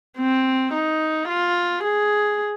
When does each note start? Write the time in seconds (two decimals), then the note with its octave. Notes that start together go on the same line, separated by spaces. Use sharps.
0.18 C4
0.74 D#4
1.29 F4
1.84 G#4